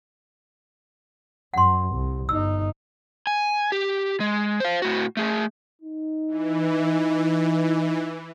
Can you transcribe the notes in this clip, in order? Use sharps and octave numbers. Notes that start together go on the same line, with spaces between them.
F#2 F#5 C6
C2
G1 D#4 E6
G#5
G4
G#3
C5 F5
A2 F#4
A3 G#4
D#4
E3